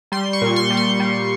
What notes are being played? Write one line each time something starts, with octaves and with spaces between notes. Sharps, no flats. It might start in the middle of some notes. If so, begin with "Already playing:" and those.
G3 C6
C#6
A#2
C6
G3
C6
G3